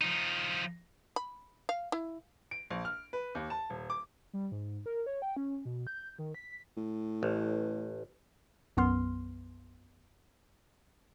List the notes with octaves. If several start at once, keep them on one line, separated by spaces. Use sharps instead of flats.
F3 D#4
B5
F5
E4
D7
A#1
F6
B4
D#2
A5
D#1
D6
G3
G#2
A#4
C#5
G5
C#4
B2
G6
D#3
B6
A2
A1
B1 F#2 B3 C6 F6